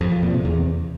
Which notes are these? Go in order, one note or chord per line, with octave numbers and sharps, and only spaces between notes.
F2
F3
A#2
C3
E2